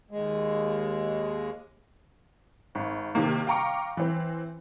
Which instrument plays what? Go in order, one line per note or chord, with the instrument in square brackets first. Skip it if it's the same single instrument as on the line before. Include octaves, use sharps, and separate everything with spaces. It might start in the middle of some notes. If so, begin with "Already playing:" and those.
[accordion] D#2 G#3
[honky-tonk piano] G#1
C3 D#3 A#3
F5 G5 A#5 C#6 D6
E3 C4